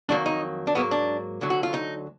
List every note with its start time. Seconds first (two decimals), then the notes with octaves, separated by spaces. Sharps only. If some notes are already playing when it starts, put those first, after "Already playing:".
0.09 F2 D#3 F#3 A#3 D4
0.26 D#4
0.67 D4
0.75 G#2 F#3 A#3 B3
0.91 D4
1.41 D2 D3 F#3
1.50 F#4
1.63 F4
1.74 D#4